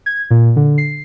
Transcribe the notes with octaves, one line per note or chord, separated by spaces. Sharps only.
G#6
A#2
D3
C7